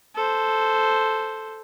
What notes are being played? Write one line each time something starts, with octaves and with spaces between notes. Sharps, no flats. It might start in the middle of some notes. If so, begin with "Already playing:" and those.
A4 C5